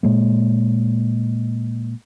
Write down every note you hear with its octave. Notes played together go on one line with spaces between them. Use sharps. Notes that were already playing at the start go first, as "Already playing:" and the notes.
A#2 G#3 A#3